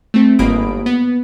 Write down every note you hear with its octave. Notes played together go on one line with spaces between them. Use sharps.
A3 C4
G1 G#2 A#3 B5 D#6 D7
B3